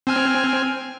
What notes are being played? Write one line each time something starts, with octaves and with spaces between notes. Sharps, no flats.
C4 G#5 F6